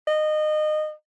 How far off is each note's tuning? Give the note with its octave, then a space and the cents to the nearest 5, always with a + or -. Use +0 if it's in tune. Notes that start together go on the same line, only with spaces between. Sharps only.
D#5 -25